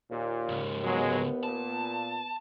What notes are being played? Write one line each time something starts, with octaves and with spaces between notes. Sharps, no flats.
D#2 A#2
C#2 G#2
F#3 G#3 B3
A#2 A5